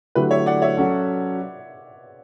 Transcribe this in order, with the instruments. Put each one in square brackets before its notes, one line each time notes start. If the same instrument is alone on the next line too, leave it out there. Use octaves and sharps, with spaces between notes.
[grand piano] D3 F#3 A3 E4 G4 [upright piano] B4
[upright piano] C#5 E5
D5 F#5
C#5 E5
[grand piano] F#3 C#4 F#4 A4